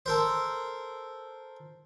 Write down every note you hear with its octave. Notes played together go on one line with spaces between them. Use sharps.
A4 A#4 C5